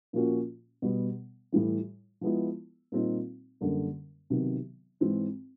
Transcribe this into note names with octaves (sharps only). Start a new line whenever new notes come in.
A#2 F3 A#3 C#4 F#4
B2 G3 B3
A2 E3 G3
F3 G#3 B3 E4
A#2 G3 C4 D#4
F#2 D3 G3 A#3
C3 D#3 F#3 B3
G#2 E3 G#3 C4